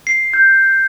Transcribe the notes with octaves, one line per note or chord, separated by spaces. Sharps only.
C7
G6